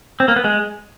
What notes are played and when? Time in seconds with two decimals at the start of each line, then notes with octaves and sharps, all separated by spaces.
0.20 C4
0.28 A#3
0.36 B3
0.44 G#3